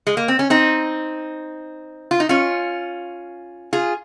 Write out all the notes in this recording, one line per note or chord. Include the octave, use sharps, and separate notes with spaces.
G#3
A#3
C4
C#4
C4 D#4
F4
D#4
C#4 F4
F4 G#4